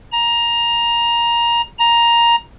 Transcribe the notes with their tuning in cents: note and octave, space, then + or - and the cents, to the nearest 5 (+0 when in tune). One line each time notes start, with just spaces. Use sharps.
A#5 +15
A#5 +10